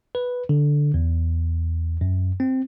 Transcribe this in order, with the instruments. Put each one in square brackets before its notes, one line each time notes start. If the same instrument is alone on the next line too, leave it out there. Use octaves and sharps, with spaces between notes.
[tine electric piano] B4
D3
E2
F#2
C4